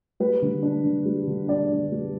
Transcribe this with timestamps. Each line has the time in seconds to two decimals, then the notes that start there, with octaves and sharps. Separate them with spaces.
0.20 G3 B4
0.42 D3
0.63 D4
0.84 D3
1.06 G3
1.28 D3
1.48 D4 D5
1.70 D3
1.92 G3